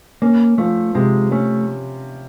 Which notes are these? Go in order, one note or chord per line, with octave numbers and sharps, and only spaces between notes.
A#3 C#4
F3 A3
C3 G#3
A3 C#4